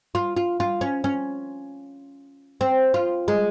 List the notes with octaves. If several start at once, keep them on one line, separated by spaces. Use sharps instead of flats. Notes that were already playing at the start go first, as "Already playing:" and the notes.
F4
F4
F4
C#4
C#4
C4
F4
G#3